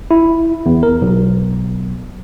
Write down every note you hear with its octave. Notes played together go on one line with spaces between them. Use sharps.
E4
E2
A#4
B1